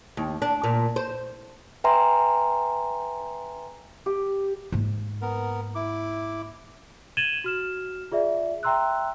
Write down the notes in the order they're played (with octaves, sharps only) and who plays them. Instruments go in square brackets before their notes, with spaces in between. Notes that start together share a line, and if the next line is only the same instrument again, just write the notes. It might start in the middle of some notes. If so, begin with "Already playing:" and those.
[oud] D#2
D4
A#2
C5
[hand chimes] B4 E5 G5 G#5 A#5 C6
[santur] G4
[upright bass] G#2 A#3
[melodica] B3 A#4
E4 D6
[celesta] G#6 A6 D#7 E7 F#7 G7
F#4 F6 E7
F4 G#4 D5 E5
E5 G5 A#5 C6 E6 F#6